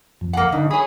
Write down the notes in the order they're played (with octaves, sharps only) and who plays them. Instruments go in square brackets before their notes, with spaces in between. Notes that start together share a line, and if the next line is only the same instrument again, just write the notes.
[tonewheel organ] F2
[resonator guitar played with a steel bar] A#3 F#5
[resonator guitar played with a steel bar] G2 [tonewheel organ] D3 D#4
[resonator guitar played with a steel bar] G#4 C#5 [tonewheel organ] B5 D#6